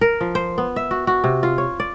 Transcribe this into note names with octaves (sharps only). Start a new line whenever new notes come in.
A#4
F3
C5
B3
E5
F#4
F#4
C3
F4
C#5
D5